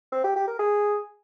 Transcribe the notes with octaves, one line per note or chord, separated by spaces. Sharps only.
C4
G4
G4
A#4
G#4